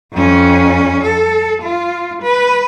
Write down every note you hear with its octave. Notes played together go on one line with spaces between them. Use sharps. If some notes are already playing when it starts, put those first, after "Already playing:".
F2 C#4
A4
F4
B4